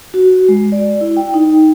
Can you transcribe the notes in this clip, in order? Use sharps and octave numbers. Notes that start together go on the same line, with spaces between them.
F#4
G#3
D5
E4
G5
D#4